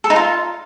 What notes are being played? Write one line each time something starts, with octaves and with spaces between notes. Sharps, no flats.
A4
D#4
F4